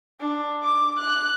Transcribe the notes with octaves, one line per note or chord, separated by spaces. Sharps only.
D4
D6
F#6